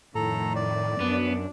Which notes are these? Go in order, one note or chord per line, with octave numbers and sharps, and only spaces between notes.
F2 A2 D#3 A4 A#5
D5
F#2 B3 D4